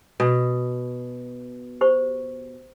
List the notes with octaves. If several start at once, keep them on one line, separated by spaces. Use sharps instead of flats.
B2
G4 C5 C#6